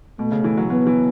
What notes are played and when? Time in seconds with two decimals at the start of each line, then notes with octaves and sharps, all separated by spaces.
0.19 B2 A3
0.32 C#3
0.44 E3
0.57 F#3
0.70 F#3 B3
0.87 E3